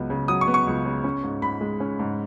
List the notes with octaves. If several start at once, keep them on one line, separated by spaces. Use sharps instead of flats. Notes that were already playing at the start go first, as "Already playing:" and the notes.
Already playing: C#2 F#3 B3
C#3
F#3 D#6
C#6
B3
C#6
C#2
C#3
C#4
G#2
G#2 B5
G#3
C#4
G#2